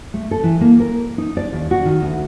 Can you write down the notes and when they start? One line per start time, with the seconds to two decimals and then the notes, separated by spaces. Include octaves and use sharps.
0.14 A3
0.31 A4
0.43 E3
0.61 A#3
0.80 A#4
1.18 D#4
1.37 D5
1.53 D#2
1.71 F#4
1.85 D#3
2.02 D2